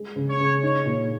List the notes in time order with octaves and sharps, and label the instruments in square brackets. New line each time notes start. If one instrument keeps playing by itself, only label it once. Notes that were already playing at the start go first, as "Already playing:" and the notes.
Already playing: [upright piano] G#3
C#3
[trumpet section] C#5
[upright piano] C#3
[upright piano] D#4 [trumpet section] C#5
[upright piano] A#2